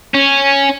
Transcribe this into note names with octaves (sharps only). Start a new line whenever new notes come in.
C#4